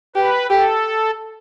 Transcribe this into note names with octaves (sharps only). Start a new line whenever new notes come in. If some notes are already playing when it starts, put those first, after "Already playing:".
G4 B4
G4 A4